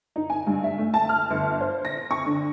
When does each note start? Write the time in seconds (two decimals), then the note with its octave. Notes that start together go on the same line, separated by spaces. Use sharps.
0.16 D#4
0.30 G#5
0.47 G2
0.64 E5
0.78 A3
0.94 A5
1.09 F6
1.30 G1
1.61 C5
1.85 A#6
2.11 C#6
2.25 D3